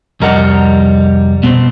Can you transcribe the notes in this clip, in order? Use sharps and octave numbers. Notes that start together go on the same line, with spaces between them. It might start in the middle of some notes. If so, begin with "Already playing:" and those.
C2 F2 G3 A#4 D#5 F#5
B2 B3 C4